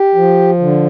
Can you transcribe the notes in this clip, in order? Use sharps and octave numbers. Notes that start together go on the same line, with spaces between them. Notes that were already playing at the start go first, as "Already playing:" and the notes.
Already playing: G4
F3
D3